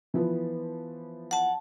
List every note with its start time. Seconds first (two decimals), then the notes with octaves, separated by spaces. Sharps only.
0.14 E3 F3 B3
1.31 F#5 A5